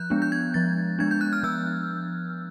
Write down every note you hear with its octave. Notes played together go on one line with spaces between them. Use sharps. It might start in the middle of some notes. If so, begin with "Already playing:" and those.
Already playing: F3 F#6 G6
G#3 B3 D4
G6
G#6
F3 A6
G#3 B3 D4 G#6
G6
F#6
F6
F3 E6